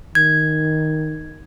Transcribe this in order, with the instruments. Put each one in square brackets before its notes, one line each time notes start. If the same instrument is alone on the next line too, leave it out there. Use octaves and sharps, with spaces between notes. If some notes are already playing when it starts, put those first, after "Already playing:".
[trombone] D#3 [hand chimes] G#6